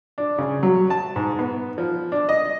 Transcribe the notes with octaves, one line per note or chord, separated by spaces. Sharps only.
D4
C#3
F#3
A5
G#2
B3
F3
D4
D#5